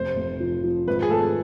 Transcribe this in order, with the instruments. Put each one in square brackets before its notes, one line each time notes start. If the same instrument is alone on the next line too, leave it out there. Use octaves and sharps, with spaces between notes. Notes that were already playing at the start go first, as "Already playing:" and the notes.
Already playing: [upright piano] F1 [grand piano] C5
[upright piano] F1
F3
F3
[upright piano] G#1 [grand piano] B4
[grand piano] G#4
[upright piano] A3 [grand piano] A4